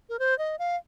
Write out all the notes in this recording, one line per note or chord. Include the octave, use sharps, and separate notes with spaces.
A#4
C5
D#5
F5